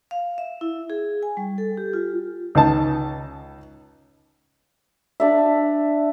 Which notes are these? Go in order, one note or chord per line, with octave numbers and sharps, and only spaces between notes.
F5
E5
E4
G#4
G#5
G3
A4
G4
F4
C#2 D#4 A5
D4 D5 E5